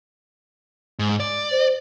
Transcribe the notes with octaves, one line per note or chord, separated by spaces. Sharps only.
G#2
D5
C5